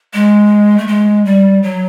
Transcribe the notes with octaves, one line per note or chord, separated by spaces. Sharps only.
G#3
A3
G#3
G3
F#3